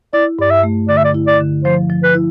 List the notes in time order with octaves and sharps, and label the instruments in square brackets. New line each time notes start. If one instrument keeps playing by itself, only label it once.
[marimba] E4 [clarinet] D5
[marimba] G2 [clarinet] D5
[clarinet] E5
[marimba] A3
[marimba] D3 [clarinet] D5
[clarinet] E5
D5
[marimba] E4
[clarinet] D5
[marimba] D3
[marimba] F3 [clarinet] C5
[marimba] F3
[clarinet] B4
[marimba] E4